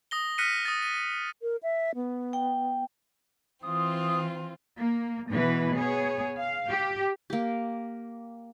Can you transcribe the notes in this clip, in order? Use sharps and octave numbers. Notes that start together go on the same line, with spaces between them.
D#6 A#6 G7
F6 F#6 A#6 B6 C#7 D#7
D#6 A6
D#7
A#4
E5
B3
G5
E3 C4 F4 D#6
A#3
B2 E3 G#3 B4
B3 G#4 C#5
F5
G4
A#3 G4